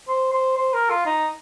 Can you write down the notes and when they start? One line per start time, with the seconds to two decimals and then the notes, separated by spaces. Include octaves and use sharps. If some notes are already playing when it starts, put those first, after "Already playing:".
0.08 C5
0.33 C5
0.57 C5
0.73 A#4
0.90 F4
1.06 D#4